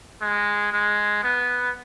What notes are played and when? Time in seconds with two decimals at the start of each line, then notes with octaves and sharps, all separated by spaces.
0.22 G#3
0.73 G#3
1.23 B3